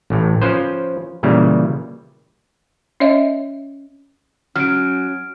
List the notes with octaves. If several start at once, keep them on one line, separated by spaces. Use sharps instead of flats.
A1 A2
F3 C#4 B4 C5
A#2 C#3 E3 G3
C#4 C#5 D#5 E5
F#3 C#4 F6 D7